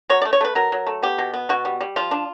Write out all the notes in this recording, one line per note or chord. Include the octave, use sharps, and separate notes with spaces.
F#3 C#5
D5
A3
C#5
A3 B4
F#3 A#4
F#3
A3
B3 G4
B2
B3
B2 F#4
G3
G3
F3 F4
D4